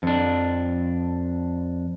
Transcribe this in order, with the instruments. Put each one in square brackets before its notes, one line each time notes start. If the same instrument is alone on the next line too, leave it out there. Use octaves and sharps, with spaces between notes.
[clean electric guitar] F2 D4